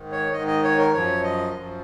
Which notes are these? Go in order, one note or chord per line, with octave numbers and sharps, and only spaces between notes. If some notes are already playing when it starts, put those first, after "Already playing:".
Already playing: G#2 D#3
C#5
G#2 D#3 D#5
D#5
C#5
A#4
F#2 F3 C#5
D#5
F#2 F3